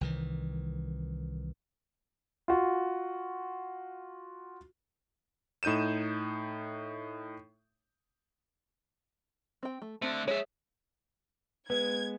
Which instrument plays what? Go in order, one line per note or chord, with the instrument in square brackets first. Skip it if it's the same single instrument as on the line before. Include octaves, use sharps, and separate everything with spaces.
[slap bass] C2 D#3 E3
[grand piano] F4 F#4
[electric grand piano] A2 D#4 G6 D#7 E7
[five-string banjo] C4 G5
A3
[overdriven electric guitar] D3 A3 [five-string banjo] C4
[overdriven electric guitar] G#3 E5 [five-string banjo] G#4 C#5
[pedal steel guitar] G#3 B3 [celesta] B4 [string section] G#6